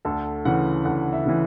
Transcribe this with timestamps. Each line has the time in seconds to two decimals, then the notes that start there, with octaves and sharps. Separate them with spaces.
0.05 D2 A4
0.45 C#3 E3 F#5
0.85 D2 F#5
1.12 E5
1.26 C#3 E3